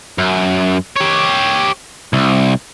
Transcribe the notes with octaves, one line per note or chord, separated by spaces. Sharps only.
F#2
G4 C#5
C2